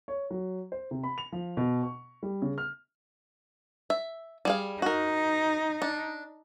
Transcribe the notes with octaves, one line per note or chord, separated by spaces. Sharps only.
C#5
F#3
C5
C3
B5
F7
F3
B2
C#6
G3
C#3
F6
E5
G3 G#4 F5
D#4 F#4 A#4
D4